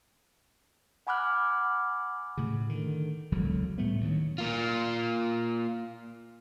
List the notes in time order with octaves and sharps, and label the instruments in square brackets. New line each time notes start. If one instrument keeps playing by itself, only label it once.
[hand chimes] F#5 G#5 B5 D6 F6 F#6
[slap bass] A2 C#3
D3 D#3
E1 C#2 D3 F#3
A2 G3 A3 B3
D2 D#3 F#3
[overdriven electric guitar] A#3 F4